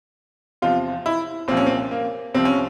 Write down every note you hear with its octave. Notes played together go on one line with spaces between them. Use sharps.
E2 C3 F3 F4
E4
C2 A#2 F3 C4
C#4
C4
A#3
C2 C3 F3 C4
C#4